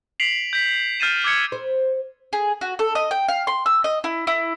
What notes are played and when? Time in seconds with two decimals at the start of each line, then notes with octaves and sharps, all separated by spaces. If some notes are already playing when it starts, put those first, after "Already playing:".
0.20 B6 C7 D7 F7 F#7
0.53 G6 B6
1.00 F6 G6 A6 C7 D#7 E7
1.24 D6 E6 G#6 C#7
1.52 C5
2.33 G#4
2.61 F#4
2.79 A4
2.95 D#5
3.11 G5
3.29 F5
3.47 C6
3.66 E6
3.84 D#5
4.04 E4
4.27 E4